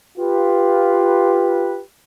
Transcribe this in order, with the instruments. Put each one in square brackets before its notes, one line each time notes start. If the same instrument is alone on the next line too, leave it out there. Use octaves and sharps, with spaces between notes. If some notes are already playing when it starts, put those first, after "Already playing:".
[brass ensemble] F4 G4 B4